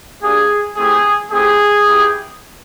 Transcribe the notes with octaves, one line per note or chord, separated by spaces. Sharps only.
A#3 D4 G4 G#4
A3 C4 E4 G4 G#4
A3 C4 E4 G4 G#4
B3 E4 G4